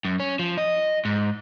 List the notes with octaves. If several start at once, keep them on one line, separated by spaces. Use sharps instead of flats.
F#2
C#4
F3
D#5
G#2